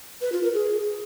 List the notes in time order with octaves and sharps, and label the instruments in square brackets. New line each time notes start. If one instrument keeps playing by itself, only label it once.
[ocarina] B4
F4
A#4
G#4